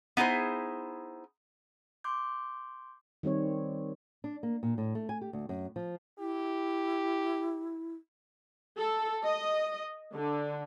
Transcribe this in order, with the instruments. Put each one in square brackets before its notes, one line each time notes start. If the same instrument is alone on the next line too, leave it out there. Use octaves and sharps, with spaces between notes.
[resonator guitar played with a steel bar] B3 D#4 E4 G#4 C5
[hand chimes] C6 D6 G6
[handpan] D#3 G3 C4 C#5
[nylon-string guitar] D4
A#3
A#2
A2
A3
G#5
G4
D2
F#2
F3
[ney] E4 [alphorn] G4
[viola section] A4
D#5
D3